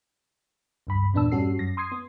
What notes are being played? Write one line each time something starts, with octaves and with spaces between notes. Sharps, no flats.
C#2 G2 B5
E2 A#2 B3 D4 A5 E6
G2 G3 C#4 F#4 A4 C7
F#2 A#6
C6 D#6 G#6 C7
B3